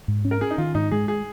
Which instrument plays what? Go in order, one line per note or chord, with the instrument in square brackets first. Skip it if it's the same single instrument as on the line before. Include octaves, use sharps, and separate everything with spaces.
[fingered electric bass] G#2
C#4
[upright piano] A#4
[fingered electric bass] C#4 [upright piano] G#4
[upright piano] D#4
[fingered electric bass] D#3 [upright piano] F4
[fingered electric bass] G#2 [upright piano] D#4
[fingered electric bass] G#3 [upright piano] G#4
[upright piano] G#4